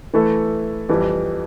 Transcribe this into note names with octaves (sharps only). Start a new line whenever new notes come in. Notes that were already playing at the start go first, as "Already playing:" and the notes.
E3 A3 E4 A4
F2 E3 G3